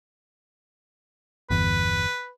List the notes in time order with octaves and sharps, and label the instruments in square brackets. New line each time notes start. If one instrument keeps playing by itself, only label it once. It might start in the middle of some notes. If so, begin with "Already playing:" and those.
[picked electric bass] G1 E2 [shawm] B4